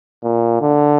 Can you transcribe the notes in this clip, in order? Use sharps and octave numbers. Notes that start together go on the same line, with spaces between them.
A#2
D3